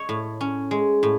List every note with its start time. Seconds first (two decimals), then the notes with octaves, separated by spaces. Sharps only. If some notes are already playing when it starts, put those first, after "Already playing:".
Already playing: C#5 D#5
0.09 A2
0.41 C#4
0.71 G#3
1.03 A2